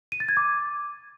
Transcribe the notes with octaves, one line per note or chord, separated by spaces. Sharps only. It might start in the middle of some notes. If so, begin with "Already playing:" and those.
D#7
A6
G#6
D6